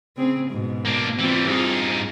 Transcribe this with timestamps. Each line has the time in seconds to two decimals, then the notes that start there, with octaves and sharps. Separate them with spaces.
0.17 C#3 C4 G#4
0.50 G#2 B2
0.85 A#3 D4
1.19 E3 G3 C4 F4
1.47 G2 C4 D#4 F4 G#4